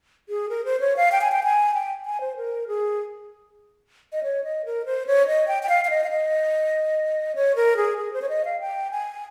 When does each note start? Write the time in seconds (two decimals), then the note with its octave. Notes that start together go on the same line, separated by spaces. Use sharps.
0.29 G#4
0.49 A#4
0.65 C5
0.80 C#5
0.97 F5
1.12 G5
1.21 G#5
1.32 G5
1.43 G#5
1.74 G5
2.06 G#5
2.21 C5
2.37 A#4
2.68 G#4
4.13 D#5
4.23 C#5
4.44 D#5
4.65 A#4
4.86 C5
5.07 C#5
5.27 D#5
5.48 G5
5.63 G5
5.69 F5
5.85 F5
5.90 D#5
6.04 F5
6.10 D#5
7.35 C#5
7.56 A#4
7.77 G#4
7.98 G#4
8.13 C5
8.22 C#5
8.29 D#5
8.45 F5
8.60 G5
8.91 G#5